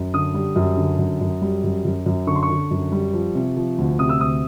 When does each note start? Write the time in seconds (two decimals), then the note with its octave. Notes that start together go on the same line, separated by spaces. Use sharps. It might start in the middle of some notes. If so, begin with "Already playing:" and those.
Already playing: F#2
0.14 D3 D#6
0.34 G3
0.56 F#2
0.77 D3
0.99 F#2
1.21 F#2
1.41 G3
1.64 F#2
1.85 F#2
2.06 F#2
2.27 D3 C#6
2.36 C6
2.43 C#6
2.49 D3
2.71 F#2
2.92 G3
3.13 F3
3.35 C3
3.57 F3
3.78 D2
3.99 C3 D#6
4.09 E6
4.21 D2 D#6